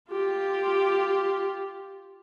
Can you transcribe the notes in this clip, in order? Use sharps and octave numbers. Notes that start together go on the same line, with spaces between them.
F4 G4